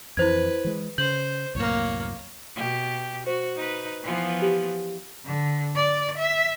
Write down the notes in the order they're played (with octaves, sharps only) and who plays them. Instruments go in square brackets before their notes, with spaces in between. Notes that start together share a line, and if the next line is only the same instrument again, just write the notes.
[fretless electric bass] F2 E3 [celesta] E4 C5 G#6 [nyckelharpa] B4
[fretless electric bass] E3 G#3
[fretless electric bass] C#3 [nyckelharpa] C5 [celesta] G6 F#7
[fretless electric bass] C2 F#2 A2 [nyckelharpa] A#3 C#5
[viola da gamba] B2 G4
[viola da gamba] F#4 [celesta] C5
[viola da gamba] D#4 B4
E3 F3 B3
[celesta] G4
[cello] D3
D5
E5